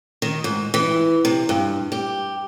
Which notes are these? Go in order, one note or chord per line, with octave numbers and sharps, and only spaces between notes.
D#3
G#2
E3
C3
G2
G4